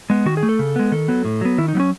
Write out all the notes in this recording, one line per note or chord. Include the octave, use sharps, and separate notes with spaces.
G#3 B3
D#3 F#4
G#4
A3
A4
C#3
G#3 B3
D#3 A4
F#3 B3
A2
F#3 B3
D#3 E4
D#4
F#3 B3 C#4